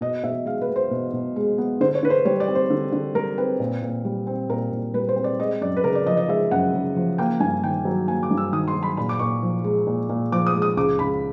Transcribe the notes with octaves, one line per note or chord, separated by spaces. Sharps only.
B2 D#5
B2 E5
G#3 F5
B4
B3
C5
B2
B2
G#3
B3
D3 C5
C#5
D3 B4
C5
G3 C#5
D5
C4
C5
D3
D3
G3 A#4
C4 B4
A#2
A#2
G3
C4
A#2 A#4
A#2
G3 B4
C5
C4
D5
G#3 D#5
F#2 D5
B4
C#3 A#4
D5
F3 D#5
D#5
G#3 E5
F#2 F#5
C#3
F3
A#3 G5
G2 G#5
D#3 G5
F#3
A#3 G#5
D6
G2
E6
D#3 D#6
C6
F#3
B5
A#2 B5
D6
A#2 C#6
F3
G#3
A#2
A#2
F3 D6
D#6
G#3
D#6
C#2 D6
C#2 B5